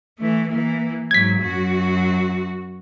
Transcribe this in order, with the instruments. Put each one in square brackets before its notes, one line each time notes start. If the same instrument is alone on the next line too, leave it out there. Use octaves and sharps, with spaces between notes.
[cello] E3 A3
E3 A#3
[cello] G#2 F#3 [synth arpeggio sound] G#6 B6
[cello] F#2 F#4